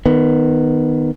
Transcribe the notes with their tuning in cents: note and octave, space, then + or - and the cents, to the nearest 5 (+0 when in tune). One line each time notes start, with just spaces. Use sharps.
D#3 -10 B3 +10